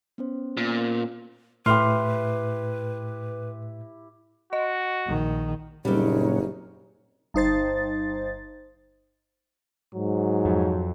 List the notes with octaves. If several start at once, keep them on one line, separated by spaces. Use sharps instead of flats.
B3 C#4 C5
A#2
A2 E4 G4 B4 C6 F6
F#4 D#5
A#1 D#3
F#1 A#2 F#3 G3 C4 C#4 D#4
G1 D#4 C5 A6
G#2 F#3
F2